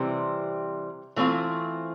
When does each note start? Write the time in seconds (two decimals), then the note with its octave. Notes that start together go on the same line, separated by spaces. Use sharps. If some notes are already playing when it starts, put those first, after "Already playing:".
Already playing: C3 E3 G3 C4
1.16 E3 A3 C4 F4